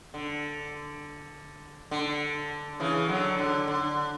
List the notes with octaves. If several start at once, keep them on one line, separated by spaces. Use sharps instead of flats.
D3
D3
C#3 E3
D3 F#3
D3
D3